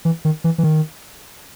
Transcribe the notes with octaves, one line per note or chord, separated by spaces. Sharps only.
E3
D#3
E3
E3
D#3